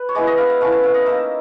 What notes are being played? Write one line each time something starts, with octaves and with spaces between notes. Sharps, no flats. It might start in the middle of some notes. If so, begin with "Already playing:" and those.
Already playing: B4
C#5
G#3 B3 E4 D5
D#5
F5
E5
A3 C#4 E4 F5
E5
F5
D#5
A#3 D#4 E5